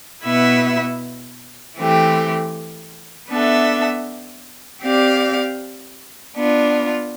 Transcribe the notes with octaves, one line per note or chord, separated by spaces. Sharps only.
B2 B3 E4 B4 E5
E3 A3 C4 G4
B3 D4 A4 E5
C4 G4 D5 F5
B3 D4 F4